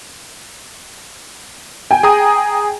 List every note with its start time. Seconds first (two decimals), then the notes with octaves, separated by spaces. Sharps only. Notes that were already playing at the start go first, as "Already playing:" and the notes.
1.91 G5 G#5
2.03 G#4 A#5 D#6